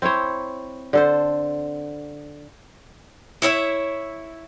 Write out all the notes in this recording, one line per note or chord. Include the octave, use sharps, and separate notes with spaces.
C4 E4 C5 C#5
D3 A4 C5
E4 C#5 D#5 E5